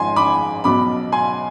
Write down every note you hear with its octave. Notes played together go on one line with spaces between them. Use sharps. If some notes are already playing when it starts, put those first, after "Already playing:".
Already playing: G#1 G#2 F3 G#5 C6
B5 D6
B1 B2 B5 D6
G#5 C6